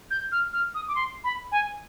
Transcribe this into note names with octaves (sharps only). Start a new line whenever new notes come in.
G6
F6
F6
D#6
D6
C6
B5
G#5